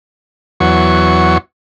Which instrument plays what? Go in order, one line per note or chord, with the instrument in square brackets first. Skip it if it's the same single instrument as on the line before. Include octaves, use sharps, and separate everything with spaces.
[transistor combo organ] E2 F#3 C#6